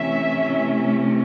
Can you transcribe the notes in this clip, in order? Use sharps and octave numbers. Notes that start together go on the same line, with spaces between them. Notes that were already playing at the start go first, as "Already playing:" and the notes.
Already playing: C3 E3 A3 C#4 E5